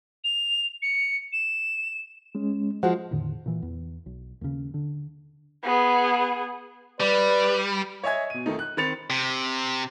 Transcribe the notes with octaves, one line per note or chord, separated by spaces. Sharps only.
F7
C#7
E7
G#3 C#4
F3 G#3 F#4 C5 F#5
E2 A2 D3 D#3
A#2 E3
E2
B1
D#2 C#3
D3
B3 G#4
G3 B4 D5
C#5 D#5 E5 G#5 G#6
B2 D#7
F2 D#3 A3 D#4
F#6
D#3 C4 B5 A6 C#7 F7
C3